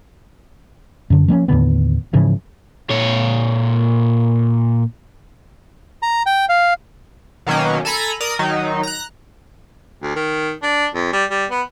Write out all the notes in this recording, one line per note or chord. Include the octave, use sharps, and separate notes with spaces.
F#2 D3
F3 A#3 C4 C#4
D#2 A2 D3 B3
G#2 C#3 E3 F3
A#2 C#5
A#5
G5
F5
B2 D#3 F#3 A#3 C#4
A4 G#5 A#5 B5
A#4 D5 D#6
D#3 F#3 D#4
A#5 F#6
D2
D#3
D4
F2
G3
G3
B3